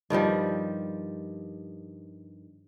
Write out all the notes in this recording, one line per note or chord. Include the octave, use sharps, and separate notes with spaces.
G2 D#3 F3 G3